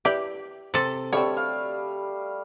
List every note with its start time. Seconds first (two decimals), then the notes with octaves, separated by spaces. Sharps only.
0.05 E4 G4 B4 D5
0.74 C3 A4
1.13 D3 G3 A3 C4 C#5
1.37 F5